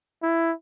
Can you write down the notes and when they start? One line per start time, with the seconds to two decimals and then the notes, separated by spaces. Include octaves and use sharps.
0.23 E4